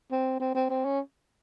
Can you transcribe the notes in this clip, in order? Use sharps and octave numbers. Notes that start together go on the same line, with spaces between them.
C4
C4
C4
C4
C#4